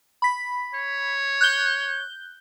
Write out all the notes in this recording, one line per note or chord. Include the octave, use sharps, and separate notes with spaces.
B5 B6
C#5
F#6 G6 G7